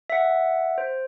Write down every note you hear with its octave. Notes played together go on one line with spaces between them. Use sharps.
E5 F#5
C5